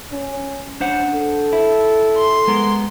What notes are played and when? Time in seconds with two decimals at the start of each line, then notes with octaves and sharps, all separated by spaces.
0.12 C#4
0.80 C#4 D4 C5 F#5
1.14 A4
1.53 E4
2.16 C6
2.47 G#3 B3 A#4